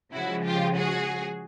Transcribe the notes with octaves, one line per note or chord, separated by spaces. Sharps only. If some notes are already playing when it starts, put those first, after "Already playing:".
C#3 F3 G#3 E4 F#4
F4 G4
F#4 G#4